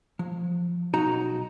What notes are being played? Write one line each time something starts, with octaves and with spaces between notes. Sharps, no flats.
F3
B1 D#4 F#4 A#5